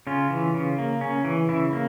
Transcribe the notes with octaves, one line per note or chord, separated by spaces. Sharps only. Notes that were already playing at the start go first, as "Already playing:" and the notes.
C#3 C#4 F4
E3
C#3
A#3
C#3 C#4
E3
C#3 E4
A#3